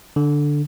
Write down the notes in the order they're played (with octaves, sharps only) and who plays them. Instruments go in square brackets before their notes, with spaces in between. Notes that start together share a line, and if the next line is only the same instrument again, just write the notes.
[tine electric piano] D3